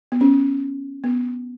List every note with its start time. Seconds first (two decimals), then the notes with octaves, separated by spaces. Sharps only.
0.12 B3
0.21 C#4
1.04 B3